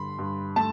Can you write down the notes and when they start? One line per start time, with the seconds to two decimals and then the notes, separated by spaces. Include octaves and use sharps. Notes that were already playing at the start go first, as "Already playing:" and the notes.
Already playing: G2 D3 B5 C6
0.19 G2
0.56 A3 A5